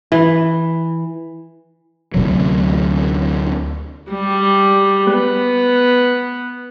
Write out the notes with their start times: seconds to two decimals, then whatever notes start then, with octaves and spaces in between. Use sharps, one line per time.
0.12 E3
2.14 D2 C3 F#3
4.10 G3
5.11 B3